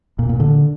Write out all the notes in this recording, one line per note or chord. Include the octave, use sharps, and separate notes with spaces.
A#2
A#2
D3